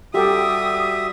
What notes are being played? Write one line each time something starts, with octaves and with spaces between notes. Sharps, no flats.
G3 F#4 G4 A4 E5 D#6